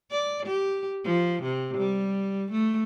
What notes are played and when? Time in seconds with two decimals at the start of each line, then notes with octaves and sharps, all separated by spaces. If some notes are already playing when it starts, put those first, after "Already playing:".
0.11 D5
0.46 G4
1.04 F3
1.43 C3
1.77 G3
2.52 A3